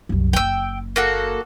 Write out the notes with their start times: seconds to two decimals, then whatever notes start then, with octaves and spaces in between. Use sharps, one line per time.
0.09 C2 F#2
0.33 F#1 G5 E6
0.96 A#3 F#4 A4